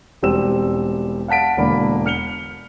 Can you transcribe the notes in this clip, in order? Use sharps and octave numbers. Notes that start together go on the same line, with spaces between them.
E1 G3 C4 E6 E7
F5 F#5 A5 B6 D7
E1 D3 A#3 B5
F6 C#7 F7 G7